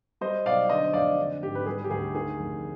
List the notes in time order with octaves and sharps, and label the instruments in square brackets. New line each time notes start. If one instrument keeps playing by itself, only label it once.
[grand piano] G3 C5 D#5
B1 D5 F5
D3 C5 D#5
F1 D5 F5
D3
G#1 G4
B4
G3 G#4
G4
D2 G#4
D#3 G#4
F1